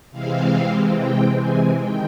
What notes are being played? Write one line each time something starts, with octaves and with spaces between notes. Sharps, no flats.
C3 E3 G#3 C4 F5
G5
G#5
D#3 G5